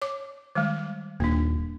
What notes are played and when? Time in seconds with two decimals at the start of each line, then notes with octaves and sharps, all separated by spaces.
0.02 C#5 D6
0.55 D#3 G3 G#3
1.20 D#1 A#3 D4